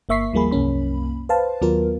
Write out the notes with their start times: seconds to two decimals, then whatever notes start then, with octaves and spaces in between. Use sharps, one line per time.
0.09 G1 A#3 E5 C#6 B6 C7
0.33 D#2 F3 G3 A#3 G#4 B5
0.51 C2 F#2 A#3 C#4 B5
1.29 B4 C5 F5 A5
1.61 D#2 F#3 B3 F4 A#4